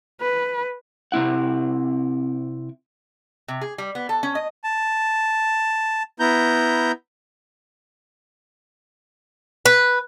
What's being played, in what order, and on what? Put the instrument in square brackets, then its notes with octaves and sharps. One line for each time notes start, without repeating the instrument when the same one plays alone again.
[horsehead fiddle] B4
[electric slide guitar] C3 C4 E4 F#5
[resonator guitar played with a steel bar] C3
G#4
G3
B3
A4
C#4
D#5
[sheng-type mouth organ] A5
B3 E4 A#5 G6
[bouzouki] B4